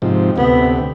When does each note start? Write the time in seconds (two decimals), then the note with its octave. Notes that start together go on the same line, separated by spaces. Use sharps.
0.02 G#2 C3 F3
0.38 D2 C3 B3